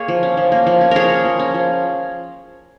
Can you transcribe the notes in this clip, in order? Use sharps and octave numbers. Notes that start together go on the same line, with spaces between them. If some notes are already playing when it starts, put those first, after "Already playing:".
Already playing: A#3 G#4 C#5
F3
C#4
F3
A#3
F3
C#4
F3 G#4 A#4 C#5
A#3
F3
C#4
F3